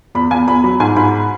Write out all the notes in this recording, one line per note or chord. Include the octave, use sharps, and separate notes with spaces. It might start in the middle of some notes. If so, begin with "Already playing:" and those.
E2 B5
E2 G#5
E2 B5
F#3 B5
G#2 G#5
G#2 B5